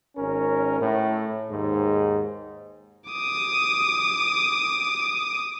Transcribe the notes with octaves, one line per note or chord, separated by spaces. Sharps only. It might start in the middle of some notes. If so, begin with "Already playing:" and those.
G#1 C#4 A#4
A2
D#2 G#2
D6 D#6